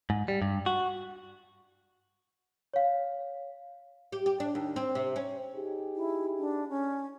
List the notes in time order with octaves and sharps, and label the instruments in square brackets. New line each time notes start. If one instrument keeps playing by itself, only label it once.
[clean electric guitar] G#2
G3
G2
F#4
[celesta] C#5 F5
[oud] G4
G4
D4
D#2
C4
C3
C#4
[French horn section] D#4 G4 G#4
[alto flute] E4
D4
C#4